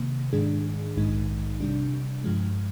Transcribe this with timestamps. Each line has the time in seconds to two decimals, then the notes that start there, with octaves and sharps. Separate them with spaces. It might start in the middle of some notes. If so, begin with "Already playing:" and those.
Already playing: C3 D#3 A#3
0.33 G#2 D#3 G#3 D4 G#4
0.96 A#1 G#2 D#3 G#3 D#4
1.60 C3 G3 D4
2.24 G2 F3 G#3